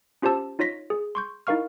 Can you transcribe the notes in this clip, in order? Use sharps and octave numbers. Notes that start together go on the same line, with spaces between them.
C#4 F4 G4 C5 A5 E6
D#4 F4 C#5 A#6 B6
G#4
C6 C#6 G6
D#4 E4 A#4 F5 C#6 F6